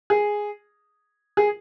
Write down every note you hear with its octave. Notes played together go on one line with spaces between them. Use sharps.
G#4
G#4